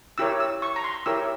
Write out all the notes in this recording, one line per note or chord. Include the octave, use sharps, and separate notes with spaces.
E4 G4 A#4 C#5 E6
E6
C#6
A#5
C6
E4 G4 A#4 C#5 E6